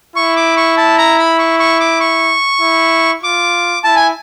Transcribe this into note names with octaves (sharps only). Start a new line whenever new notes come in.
E4 C#6
D6
C#6
A5
A#5
B5
C#6
C#6
D6
C#6
E4
F4 D6
E4 A5
G#5